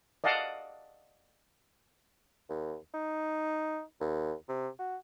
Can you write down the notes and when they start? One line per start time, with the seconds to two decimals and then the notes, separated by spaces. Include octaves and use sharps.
0.24 D5 D#5 F5 F#5 A5 D6
2.50 D#2
2.94 D#4
4.01 D#2
4.49 C3
4.79 F#4